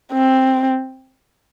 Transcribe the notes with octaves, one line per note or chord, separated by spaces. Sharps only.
C4